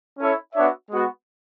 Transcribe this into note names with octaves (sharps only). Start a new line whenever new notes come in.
C#4 E4 A4 C#5 E5
B3 D4 F#4 C#5 E5
G#3 B3 F#4